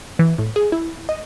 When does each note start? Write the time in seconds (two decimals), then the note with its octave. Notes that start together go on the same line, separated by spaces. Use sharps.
0.19 E3
0.38 A2
0.56 G#4
0.72 E4
1.09 D#5